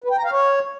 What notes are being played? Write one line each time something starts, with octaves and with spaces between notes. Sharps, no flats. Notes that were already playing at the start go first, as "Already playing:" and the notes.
B4
G5
A#5
F5
C#5